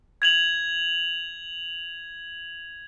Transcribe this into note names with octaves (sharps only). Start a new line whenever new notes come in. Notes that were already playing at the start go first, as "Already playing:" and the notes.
G#6 F7 F#7